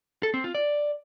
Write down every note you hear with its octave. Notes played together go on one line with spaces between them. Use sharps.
A4
C4
F4
D5